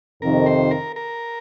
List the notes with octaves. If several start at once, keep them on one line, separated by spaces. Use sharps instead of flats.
F2 C3 D#3 A#4
C5
A#4
A#4